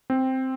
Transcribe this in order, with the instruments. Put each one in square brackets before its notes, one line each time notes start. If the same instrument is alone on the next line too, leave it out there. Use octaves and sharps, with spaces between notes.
[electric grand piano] C4